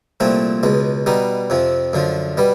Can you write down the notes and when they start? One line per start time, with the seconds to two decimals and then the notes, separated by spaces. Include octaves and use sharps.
0.20 C2 A#2 F3 A3 C4
0.63 C#2 B2 G#3
1.06 B2 G3 B3 D#4
1.50 F2 C3 F3
1.93 F#2 D3 F3
2.37 B2 G3 B3